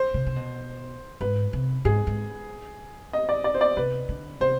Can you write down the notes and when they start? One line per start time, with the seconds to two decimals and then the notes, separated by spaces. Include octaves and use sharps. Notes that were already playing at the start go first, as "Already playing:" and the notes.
Already playing: C5
0.14 C3
0.26 C3
0.36 B2
1.21 G#2 B4
1.53 C3
1.85 G#2 G#4
2.07 G#2
3.13 D#5
3.29 D5
3.44 D5
3.54 C5
3.61 D5
3.76 C3 B4
4.09 D3
4.40 C3 C5